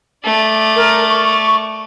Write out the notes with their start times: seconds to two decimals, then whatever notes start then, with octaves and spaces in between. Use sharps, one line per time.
0.24 A3 D5
0.76 A#4
1.08 C#6